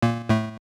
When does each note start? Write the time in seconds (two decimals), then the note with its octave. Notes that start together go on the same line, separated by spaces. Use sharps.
0.02 A#2 A#3
0.29 A2 A3